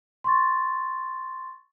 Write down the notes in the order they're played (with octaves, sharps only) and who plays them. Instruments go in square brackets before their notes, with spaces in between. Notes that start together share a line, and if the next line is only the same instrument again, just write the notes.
[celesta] C6 C#6 A6